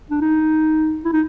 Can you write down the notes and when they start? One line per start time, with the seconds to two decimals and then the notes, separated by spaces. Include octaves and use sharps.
0.10 D4
0.21 D#4
1.05 E4
1.13 D#4